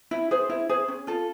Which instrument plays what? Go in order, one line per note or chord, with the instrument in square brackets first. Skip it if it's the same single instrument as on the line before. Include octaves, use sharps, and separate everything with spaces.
[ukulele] E4
G#4 C5
E4
G#4 C5
C#4
F4 A4